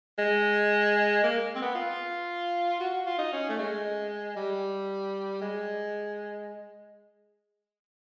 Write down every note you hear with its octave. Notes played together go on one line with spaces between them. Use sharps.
G#3
A#3
C4
B3
F4
F#4
F#4
F4
D#4
C#4
A3
G#3
G3
G#3